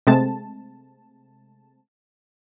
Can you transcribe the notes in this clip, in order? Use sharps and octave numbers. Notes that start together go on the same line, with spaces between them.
C3 G#3 A3 C4 A5